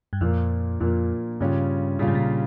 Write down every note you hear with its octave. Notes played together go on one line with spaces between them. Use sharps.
G2
F2 A#2 F3 A#3
F2 A#2 F3 A#3
G2 C#3 G3 C#4 F4
A#2 C#3 G3 C#4 F4
G#2
A#2